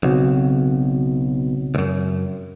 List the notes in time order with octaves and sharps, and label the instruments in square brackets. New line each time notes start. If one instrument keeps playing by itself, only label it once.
[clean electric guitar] B1 [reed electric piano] C#3 C4 F#4
[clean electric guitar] C#2 F#2